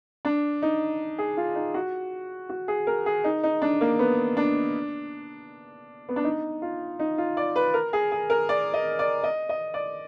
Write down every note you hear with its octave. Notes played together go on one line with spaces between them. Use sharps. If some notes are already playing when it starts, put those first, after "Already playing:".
D4
D#4
G#4
F4
D#4
F#4
F#4
G#4
A#4
G#4
D#4
D#4
D4
A#3
B3
D4
B3
D4
D#4
F4
D#4
F4
D5
B4
A#4
G#4
G#4
A#4
D5
D#5
D5
D#5
D#5
D5